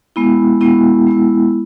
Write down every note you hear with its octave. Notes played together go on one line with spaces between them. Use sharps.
G#3 B3 E4
G#3 B3 E4
G#3 B3 E4